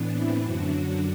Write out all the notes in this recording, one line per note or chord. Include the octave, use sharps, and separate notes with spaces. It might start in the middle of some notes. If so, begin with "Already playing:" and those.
Already playing: A2 E3 B3 D4
C4 E4
F#2 D3 F#3 D4 F#4
D4 F#4